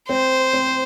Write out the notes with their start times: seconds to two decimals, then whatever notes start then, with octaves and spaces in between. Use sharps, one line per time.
0.09 C4 C5
0.53 C4